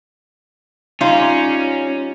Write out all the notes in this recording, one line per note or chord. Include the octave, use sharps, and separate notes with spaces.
G3 C#4 D#4 F4